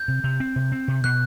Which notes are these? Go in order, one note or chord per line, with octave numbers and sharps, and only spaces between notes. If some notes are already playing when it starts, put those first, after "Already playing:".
Already playing: G6
C3
C3
C4
C3
C4
C3
B2 F#6